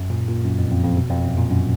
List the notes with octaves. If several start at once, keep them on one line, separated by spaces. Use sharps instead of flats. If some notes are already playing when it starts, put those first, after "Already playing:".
Already playing: F#2
A#2
A#2
F#2
F2
F2
F2
B2
F2
F#2
A#2
F#2